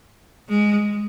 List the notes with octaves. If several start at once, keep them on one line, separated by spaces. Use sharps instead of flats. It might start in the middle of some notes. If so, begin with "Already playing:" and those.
G#3